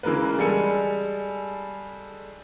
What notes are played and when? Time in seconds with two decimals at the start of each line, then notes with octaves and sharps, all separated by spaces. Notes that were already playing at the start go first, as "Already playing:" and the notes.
0.03 C#3 E3 G#3 A#3 A#4 B4
0.38 G3 G#3 A4 G#5 C#7